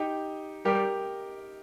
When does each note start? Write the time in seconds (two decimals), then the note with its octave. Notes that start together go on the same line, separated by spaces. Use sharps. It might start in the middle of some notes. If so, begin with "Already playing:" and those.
Already playing: D#4 G4
0.65 G3 G4 A#4